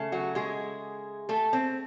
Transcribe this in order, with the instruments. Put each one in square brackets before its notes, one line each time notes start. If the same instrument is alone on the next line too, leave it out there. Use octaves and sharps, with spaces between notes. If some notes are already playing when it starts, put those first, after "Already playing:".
Already playing: [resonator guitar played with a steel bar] C#3 A3
F#3 F#4
G#3 G#4
A3 A4
C4